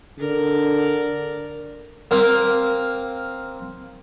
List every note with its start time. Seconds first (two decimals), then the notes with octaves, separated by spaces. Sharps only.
0.18 D3 A#4 D5
2.11 A#3 C4 F5